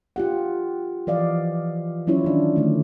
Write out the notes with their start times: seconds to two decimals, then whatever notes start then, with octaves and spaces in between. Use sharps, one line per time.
0.16 F4 G4 F#5
1.07 E3 F3 D5 D#5 F5
2.07 F#3 C#4 E4 F4 C#5
2.24 D#3 D4
2.56 D3 D#3 A3